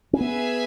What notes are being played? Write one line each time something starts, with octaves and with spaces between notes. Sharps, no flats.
C#4
B3 G#4 B4 E5 G#5